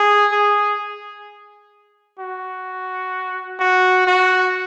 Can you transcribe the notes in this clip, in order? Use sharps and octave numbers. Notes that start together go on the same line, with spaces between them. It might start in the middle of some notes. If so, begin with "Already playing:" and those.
Already playing: G#4
G#4
F#4
F#4
F#4